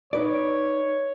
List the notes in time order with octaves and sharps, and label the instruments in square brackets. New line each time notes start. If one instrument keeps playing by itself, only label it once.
[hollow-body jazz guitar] D#4 B4 D5 [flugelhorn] C#5